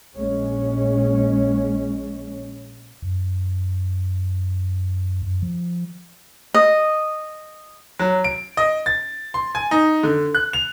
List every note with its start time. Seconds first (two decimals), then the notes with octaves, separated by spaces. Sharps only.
0.14 A#1 G#3 C#4
3.02 F#2
5.22 F#2
5.42 F3
6.54 D#5
7.99 F#3
8.24 D7
8.57 D#5
8.86 A6
9.34 C6
9.55 G#5
9.71 D#4
10.03 D3
10.35 F#6
10.53 F7